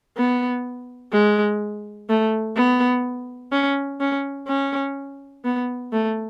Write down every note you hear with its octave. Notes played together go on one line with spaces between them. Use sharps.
B3
G#3
A3
B3
C#4
C#4
C#4
B3
A3